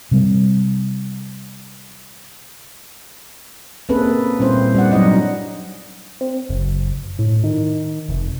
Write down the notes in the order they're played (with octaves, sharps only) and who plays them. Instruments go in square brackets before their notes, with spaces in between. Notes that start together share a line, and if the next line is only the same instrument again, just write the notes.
[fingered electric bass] C3 G3
[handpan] A#3 C4 C#4 G#4 A4 B4
A#2 G3 C4 C#4 E4 C5
G3 D5 F#5
F#3 D4 D#4 D#5 F#5
[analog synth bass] C4
F#1
A2
D#3
F1